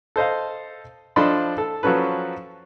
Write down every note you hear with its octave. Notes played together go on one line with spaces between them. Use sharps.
A4 C5 D#5 F5
F3 D4 A4 D#5 B5 C6
A4
F3 F#3 C#4 A4 B4